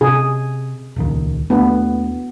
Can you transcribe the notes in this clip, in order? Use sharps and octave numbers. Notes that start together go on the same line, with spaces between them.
C3 G#4
D#1 C#2 D#3
D#2 A3 B3 D4